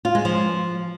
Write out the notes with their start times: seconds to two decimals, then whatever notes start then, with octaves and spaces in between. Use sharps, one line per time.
0.05 F4
0.15 G#3
0.25 F3